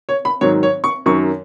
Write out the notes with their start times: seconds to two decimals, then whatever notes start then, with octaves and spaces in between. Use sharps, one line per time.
0.09 C#5
0.25 B5
0.41 G#2 D#3 F#3 C#5
0.63 C#5
0.84 C#6
1.06 F#2 D#3 F#3 C#6